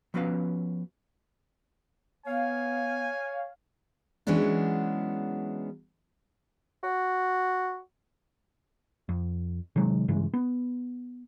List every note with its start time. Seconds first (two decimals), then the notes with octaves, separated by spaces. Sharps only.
0.14 F3 B3 C#4 F#4 B4 F5
2.26 B3 C#5 F5 G#5
4.27 E3 F#3 G#3 B3 C#4 D4
6.83 F#4
9.09 F2
9.76 C3 D#3 F#3 G#3
10.08 G2 C#3 E3 G#3
10.34 B3